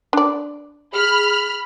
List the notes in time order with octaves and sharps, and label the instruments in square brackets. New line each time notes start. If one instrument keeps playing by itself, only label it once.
[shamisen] D4 D5
[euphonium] G#4 [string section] B5 F6